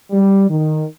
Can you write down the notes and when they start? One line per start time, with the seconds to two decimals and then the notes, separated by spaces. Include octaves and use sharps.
0.11 G3
0.49 D#3